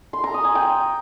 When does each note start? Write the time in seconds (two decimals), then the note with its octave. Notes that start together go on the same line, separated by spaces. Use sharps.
0.13 C6
0.24 A#5
0.34 D#6
0.45 G#5
0.55 G5